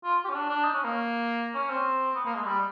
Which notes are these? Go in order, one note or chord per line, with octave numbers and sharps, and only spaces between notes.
F4
G4
C#4
D4
D4
D#4
C#4
A#3
C#4
C4
B3
A#3
G#3
G3